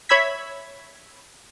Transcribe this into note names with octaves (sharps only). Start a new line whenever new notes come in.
C#5 E5 B5 E6 G#6 B6